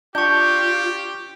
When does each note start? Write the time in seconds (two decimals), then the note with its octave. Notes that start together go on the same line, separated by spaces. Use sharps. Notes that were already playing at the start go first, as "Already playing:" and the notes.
0.15 D4 F4 G4 C#6 G6